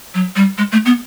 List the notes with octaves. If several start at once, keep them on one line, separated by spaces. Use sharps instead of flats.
F#3
G3
G#3
A3
B3